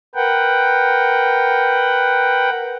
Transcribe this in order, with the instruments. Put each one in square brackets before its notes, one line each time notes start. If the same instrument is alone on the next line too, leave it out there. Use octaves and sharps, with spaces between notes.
[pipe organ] A#4 B4 F#5 G5